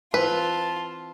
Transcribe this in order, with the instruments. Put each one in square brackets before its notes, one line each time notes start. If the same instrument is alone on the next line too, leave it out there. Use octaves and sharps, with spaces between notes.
[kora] E3 C4 [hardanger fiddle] F4 [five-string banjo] B4 [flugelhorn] A5